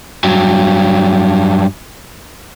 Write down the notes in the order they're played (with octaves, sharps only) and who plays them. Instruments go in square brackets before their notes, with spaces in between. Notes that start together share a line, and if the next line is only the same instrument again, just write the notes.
[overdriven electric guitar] G2 F#3